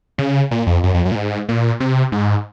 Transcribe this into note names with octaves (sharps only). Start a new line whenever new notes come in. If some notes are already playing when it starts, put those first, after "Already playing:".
C#3
A#2
F2
F#2
F2
F#2
A#2
G#2
A#2
C3
G#2